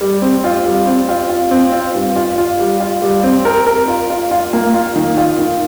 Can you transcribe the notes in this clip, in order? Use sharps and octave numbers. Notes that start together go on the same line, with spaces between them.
G3
C4
F4
G3
C4
F4
F4
C4
F4
G2
F4
F4
G3
F4
G3
C4
A#4
A#4
F4
F4
F4
A#3
F4
D#3
F4
D#3